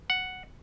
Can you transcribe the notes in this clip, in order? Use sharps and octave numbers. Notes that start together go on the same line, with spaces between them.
F#5